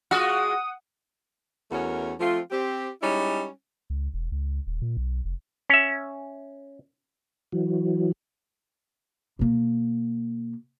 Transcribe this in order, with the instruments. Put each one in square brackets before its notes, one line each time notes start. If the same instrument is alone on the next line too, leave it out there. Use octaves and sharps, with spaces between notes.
[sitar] G#3 F4 F#4 [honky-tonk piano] F#5 [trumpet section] D#6
[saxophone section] E2 A3 C#4 F#4 A#4
F3 A3 C4 F4
C4 G4
G3 G#3 C#4 D#4 E4
[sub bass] C#2
E1
C#2
D#1
A#2
B1
F1
[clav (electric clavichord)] C#4 E5
[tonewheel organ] E3 F#3
[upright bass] B2 A#3